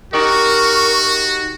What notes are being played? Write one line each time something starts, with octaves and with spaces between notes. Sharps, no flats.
D#4 F#4 G4 A#4 D#5 C#6